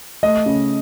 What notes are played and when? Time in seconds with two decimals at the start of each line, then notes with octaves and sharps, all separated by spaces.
0.23 A3 D#5
0.46 C#3